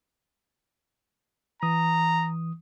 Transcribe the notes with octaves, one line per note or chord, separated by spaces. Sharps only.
E3 A#5 D#6